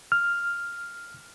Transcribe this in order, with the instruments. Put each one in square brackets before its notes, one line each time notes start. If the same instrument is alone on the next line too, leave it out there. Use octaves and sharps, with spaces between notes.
[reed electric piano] F6